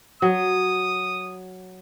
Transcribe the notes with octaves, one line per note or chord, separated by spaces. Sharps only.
F#3 D#6